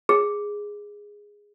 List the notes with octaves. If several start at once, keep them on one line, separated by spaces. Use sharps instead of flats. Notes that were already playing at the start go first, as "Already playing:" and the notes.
G#4